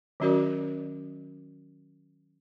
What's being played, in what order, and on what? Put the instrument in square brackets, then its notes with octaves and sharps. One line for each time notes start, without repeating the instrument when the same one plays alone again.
[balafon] D#3 F#3 C#4 F#4 A#4 D5